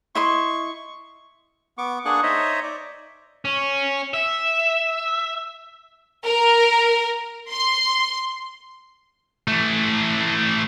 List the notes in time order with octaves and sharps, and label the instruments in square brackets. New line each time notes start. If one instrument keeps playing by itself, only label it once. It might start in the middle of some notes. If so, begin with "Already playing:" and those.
[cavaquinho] E4 D#5 C6 [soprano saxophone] C#6
[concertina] B3 C#6 D6
A#3 D4 G#4 F#5 C#6 F#6
D#4 C5 C#5 D#5 E5
D5
[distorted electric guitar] C#4
E5
[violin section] A#4
C6
[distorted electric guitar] E3 A3